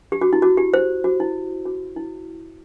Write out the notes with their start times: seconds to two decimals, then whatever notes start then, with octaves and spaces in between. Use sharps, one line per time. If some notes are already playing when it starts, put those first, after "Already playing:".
0.12 G4
0.21 F#4
0.33 E4
0.42 F#4
0.57 G4
0.74 C5
1.04 F#4
1.20 E4
1.66 F#4
1.96 E4